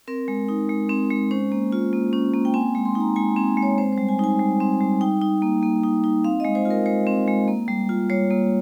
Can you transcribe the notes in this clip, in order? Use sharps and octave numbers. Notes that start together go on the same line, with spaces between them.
C4 A#4
G#3
D#4
G#3
C4
G#3
C#4 C5
A#3
F4
A#3
C#4
A#3
G5
C4 G#5
G#3
C6
D#4
A#5
G#3 G#5
C4
G#3
C#5
C4 C5
C5
G3
G#5
D#4 G#5
G3
C4
G3
D#4 G5
D#4
A#3
A#3
D#4
D#4
C4 F5
D#5
G#3
C5
F4
A#4
G#3 C5
C4
G#3
A#3
G3
F4
G3 C#5
A#3